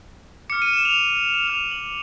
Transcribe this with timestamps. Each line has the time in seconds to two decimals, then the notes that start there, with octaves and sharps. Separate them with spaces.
0.50 D6 F6 C#7
0.62 D#7
0.73 E7
0.85 F7
1.47 D6 F6 F7
1.71 F#7